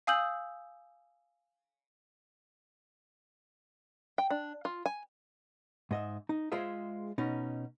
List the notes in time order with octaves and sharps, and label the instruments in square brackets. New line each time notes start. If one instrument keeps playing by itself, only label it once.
[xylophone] F5 G#5 D#6 E6 G6 F#7
[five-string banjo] G5
D4
F4
G#5
[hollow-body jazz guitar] G#2 D#5 E5
D#4
G#3 F4 G#4 C5 D#5 E5
B2 C#4 D#4